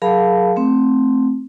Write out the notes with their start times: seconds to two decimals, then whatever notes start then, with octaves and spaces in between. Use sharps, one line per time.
0.02 F#3 G#4 A#4 F5 A5 B5
0.56 A3 C4